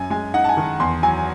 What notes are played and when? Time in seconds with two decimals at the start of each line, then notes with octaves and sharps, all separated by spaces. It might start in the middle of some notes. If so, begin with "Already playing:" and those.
Already playing: F#2 G#5
0.10 G#3 G#5
0.34 D#4 F#5
0.44 A5
0.49 G#5
0.57 D#3
0.80 E2 C6
1.03 F#3 G#5